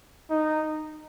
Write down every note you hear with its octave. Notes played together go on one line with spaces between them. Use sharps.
D#4